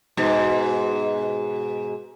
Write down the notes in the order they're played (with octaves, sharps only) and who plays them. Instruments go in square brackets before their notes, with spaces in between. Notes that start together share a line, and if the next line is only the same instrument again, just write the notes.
[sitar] G#2 B2